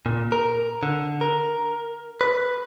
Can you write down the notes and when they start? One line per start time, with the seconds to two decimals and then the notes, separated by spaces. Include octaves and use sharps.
0.06 A#2
0.32 A#4
0.83 D3
1.21 A#4
2.21 B4